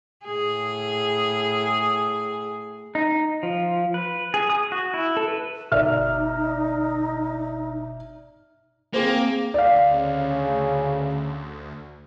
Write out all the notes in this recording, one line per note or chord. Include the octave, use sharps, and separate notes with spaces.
A2 G#4
D#4
F3
B4
G#4
D#6
F#4
E4
A4
B4
G1 B2 D#4 D5 E5 F6
A#3 C4 G#4 C5
D2 D5 F5
C#3